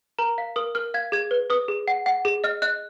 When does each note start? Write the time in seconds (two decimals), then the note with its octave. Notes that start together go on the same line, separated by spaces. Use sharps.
0.19 A#4 A#5
0.38 F5
0.56 A#4 D#6
0.75 A#4 F6
0.94 F5 G#6
1.12 G#4 G#6
1.31 B4
1.50 B4 D#6
1.68 G#4
1.88 F#5
2.06 F#5
2.25 G#4
2.44 D#5 F6
2.62 D#5 F#6